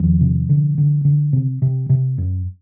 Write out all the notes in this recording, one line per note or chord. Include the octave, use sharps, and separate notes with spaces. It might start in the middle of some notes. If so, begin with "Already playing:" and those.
Already playing: E2 D#3 F3
C3
D3
D3
D3
C3
C3
C3
F#2